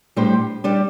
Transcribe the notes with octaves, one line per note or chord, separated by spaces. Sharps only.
A2 G3 D4 G4 C5
G3 D4 G4 D5